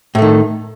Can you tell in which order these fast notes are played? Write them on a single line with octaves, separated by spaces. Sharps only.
A2 A3 D#3